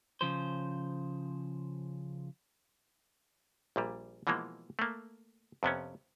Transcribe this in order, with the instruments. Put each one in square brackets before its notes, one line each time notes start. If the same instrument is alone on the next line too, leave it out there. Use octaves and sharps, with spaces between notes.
[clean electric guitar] C#3 F3 C5
[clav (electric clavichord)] A#1 A#2 G3
B2 E3 F3 G#3 A#3
A3 A#3
F2 C3 B3 C#4